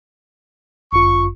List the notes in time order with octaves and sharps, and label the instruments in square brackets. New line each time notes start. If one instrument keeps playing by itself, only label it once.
[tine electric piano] G1 F#2 F4 [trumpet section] C#6